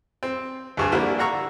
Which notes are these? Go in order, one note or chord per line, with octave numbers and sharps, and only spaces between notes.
C4
D2 G2 G#4
D3 F3 G3 A#3 D4 E4
F5 F#5 A#5 C#6 E6